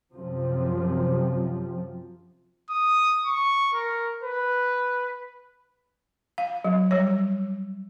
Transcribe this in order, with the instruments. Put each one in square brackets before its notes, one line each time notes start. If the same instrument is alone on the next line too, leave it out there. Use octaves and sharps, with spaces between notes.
[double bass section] F#2 C3 F3
[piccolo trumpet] D#6
C#6
A#4
B4
[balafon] F5
F#3
G3 C#5